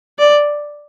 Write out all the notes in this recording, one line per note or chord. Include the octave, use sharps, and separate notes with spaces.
D5